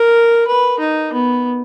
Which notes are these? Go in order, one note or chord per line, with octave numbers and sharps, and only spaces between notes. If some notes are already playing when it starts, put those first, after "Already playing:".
Already playing: A#4
B4
D#4
B3